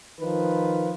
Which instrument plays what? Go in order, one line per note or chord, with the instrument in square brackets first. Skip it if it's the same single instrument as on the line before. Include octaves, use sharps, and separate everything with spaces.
[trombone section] D#3 F3 B4